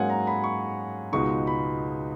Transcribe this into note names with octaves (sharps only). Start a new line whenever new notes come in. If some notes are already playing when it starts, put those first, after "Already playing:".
Already playing: G#2 F#3 A#3 C#4 F5 F#5 G#5
A#5
B5
C#6
C#2 B2 G#3 B3 D#4 C#6
B5